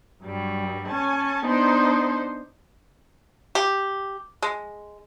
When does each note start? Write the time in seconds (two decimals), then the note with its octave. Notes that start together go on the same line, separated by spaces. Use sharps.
0.24 G2 F#3 G3
0.87 C#4 C#5 G#5 A5
1.46 B3 D4 D#4 C5
3.55 G4
4.42 G#3